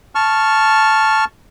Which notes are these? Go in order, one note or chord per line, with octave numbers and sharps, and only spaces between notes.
A5 C#6 F6